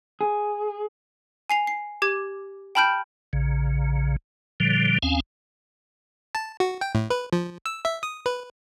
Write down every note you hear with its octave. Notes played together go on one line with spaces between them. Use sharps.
G#4
G#5 C7 F7
C7
G4 D6 G#6
G5 A5 B5 F6 G6 D7
A#1 C#3
A#2 D3 F3 G3
D#2 C4 C#4 F5 G#5
A5
F#4
G5
A2
B4
F3
E6
E5
D#6
B4